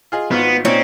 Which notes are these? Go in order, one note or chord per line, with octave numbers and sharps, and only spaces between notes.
F4 G#4 D#5
G#1 B3 F4
A#2 C4 C#4 D#4